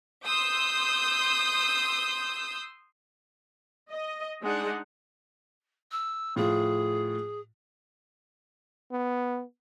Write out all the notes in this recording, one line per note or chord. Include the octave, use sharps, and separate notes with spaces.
C6 D#6 E6 G6
D#5
G#3 D4 D#4 G#4 F#5
E6
A2 F3 F4 G#4
B3